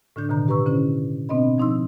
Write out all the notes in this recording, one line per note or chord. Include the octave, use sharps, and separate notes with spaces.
A2 D3 D4 G6
B2 D3 D#3 A#5 G6
G4 B4 A#5 C#6 E6
D3 C#4 E4 C5
B2 B3 C4 D4 D#5 B5
F3 D#4 C6 E6